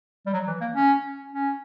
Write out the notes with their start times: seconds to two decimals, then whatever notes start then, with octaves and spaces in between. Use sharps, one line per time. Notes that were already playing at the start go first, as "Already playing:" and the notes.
0.26 G3
0.33 F#3
0.47 E3
0.61 A#3
0.75 C#4
1.32 C#4